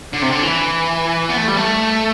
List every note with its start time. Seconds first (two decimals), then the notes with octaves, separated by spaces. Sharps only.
0.13 D3
0.22 C3
0.29 D3
0.42 E3
1.29 B3
1.38 A3
1.48 G3
1.57 A3